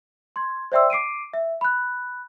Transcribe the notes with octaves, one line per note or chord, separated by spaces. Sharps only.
C6 G#6
C5 D5 E5 G5 C6 E6
D6 C7 D7 D#7
E5
B5 F#6